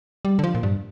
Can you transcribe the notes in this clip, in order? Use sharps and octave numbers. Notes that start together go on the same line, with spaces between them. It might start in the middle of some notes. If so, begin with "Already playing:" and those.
G3
D3
F3
A#2
G2